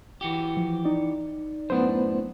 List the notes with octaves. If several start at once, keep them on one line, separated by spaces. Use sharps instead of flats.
E3 F#4 G4
F3
D#4 D5
F#2 A2 B3 D4 C5